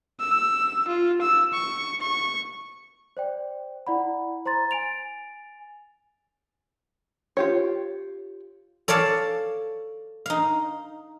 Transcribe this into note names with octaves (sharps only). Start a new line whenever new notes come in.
E6
F4
E6
C#6
C#6
C5 D5 G5
E4 D5 F#5 B5
C5 A#5 C6 A6
G#5 A6 D7 F7
F4 G4 C#5
A4 C#5 D5 F5 A5
D#4 F5